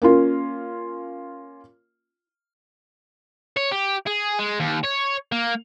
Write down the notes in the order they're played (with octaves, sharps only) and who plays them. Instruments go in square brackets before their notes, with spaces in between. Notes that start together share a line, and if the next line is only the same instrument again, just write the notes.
[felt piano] A#3 C#4 F4
[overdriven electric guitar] C#5
G4
G#4
G#3
D#2
C#5
A#3